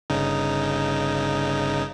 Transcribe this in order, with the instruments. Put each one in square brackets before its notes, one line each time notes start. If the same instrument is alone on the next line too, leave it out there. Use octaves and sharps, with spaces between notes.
[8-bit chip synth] G1 C#3 D#4